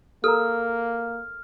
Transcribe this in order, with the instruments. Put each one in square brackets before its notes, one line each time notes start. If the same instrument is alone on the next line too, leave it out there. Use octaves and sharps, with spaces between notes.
[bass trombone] A#3 [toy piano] A4 A#4 A#5 [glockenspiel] F6